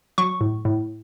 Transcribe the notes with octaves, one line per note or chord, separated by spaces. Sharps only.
F#3 C#6
A2
A2